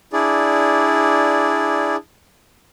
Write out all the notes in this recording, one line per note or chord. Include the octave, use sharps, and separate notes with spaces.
D4 E4 G#4 D5